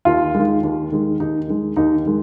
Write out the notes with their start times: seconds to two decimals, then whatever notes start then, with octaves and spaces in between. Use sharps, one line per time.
0.05 D#2 F4
0.35 D#3 G#3
0.63 D#2
0.92 D#3 G#3
1.20 D#2 D#4
1.48 D#3 G#3
1.76 D#2 D#4
2.05 D#3 G#3